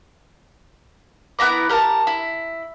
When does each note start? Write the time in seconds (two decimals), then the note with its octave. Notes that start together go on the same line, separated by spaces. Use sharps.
1.39 B3 E4 A#5 D6
1.69 G4 A#4 A5
2.07 E4